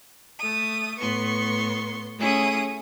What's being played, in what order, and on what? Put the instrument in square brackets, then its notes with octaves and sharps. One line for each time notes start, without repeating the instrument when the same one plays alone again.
[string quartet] A3 D#6
A2 B3 C6 C#6
A3 C#4 E4 G#4 D#6